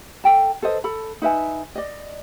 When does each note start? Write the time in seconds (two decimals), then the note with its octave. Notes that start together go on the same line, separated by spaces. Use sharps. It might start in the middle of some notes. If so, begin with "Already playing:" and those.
0.24 A4 G5 A5
0.62 A4 B4 C5 D#5
0.84 A4 B5
1.22 D#4 B4 E5 G#5
1.75 D5 D#5